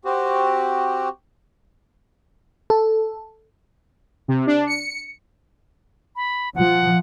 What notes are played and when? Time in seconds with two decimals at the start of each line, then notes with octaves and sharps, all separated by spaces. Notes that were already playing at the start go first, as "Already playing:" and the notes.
0.05 C4 F#4 G4
2.70 A4
4.28 C3
4.47 D4
4.67 C#7
6.16 B5
6.55 F3 F#5